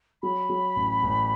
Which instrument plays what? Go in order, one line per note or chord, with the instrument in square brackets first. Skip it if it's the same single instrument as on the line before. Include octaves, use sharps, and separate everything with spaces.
[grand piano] F#3 [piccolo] B5
[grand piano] F#3
A1
A1